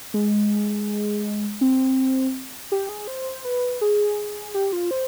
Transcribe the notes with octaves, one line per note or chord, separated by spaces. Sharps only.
G#3
C4
G4
G#4
C5
B4
G#4
G4
F4
C5